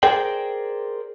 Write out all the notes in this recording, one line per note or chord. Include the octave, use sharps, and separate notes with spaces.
G#4 A#4 C5 D5 G5